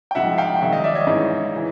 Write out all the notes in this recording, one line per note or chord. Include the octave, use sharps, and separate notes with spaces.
G5
G#2 F3 E5 F#5
F5 G5
G5
G#2 D#3 F#3 E5 F#5
D#5 F5
D5 E5
C#5 D#5
G#2 E3
E3